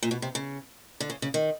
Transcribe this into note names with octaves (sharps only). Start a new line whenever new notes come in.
A#2
B2
C3
C#3
D3
C#3
C#3
D#3